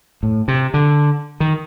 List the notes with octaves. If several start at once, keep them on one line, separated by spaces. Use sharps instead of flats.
A2
C3
D3
D#3